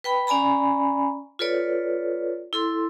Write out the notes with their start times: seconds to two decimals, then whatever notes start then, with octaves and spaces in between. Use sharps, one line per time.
0.04 B4 G5 B5
0.27 C#4 D5 G#5 A#5 B5
1.39 F4 A4 B4 C#5 D5
2.53 E4 A4 C6